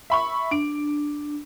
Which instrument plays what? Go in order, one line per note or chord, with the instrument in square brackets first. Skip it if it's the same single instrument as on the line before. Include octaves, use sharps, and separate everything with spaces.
[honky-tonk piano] E5 B5 C#6
[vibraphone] D4 [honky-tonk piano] D7